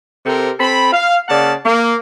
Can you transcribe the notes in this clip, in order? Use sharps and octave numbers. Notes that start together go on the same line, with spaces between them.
C3 C4 G4 A4 A#4
C4 A4 B5
F5
C#3 A#3 D5 F#5 A5
A#3